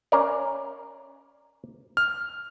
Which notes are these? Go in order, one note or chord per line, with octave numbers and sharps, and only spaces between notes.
C#4 A#4 D5
F6